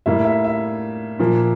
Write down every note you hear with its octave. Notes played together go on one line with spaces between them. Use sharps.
A2 G3 A#3 E5
E5
E5
A#2 F3 A#3